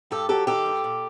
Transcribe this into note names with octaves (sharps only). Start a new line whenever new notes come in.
G2 G4 A4
F#3 G4 A4
D#3 G4 A4
G2
A#2